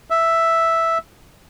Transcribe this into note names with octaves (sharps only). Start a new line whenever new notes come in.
E5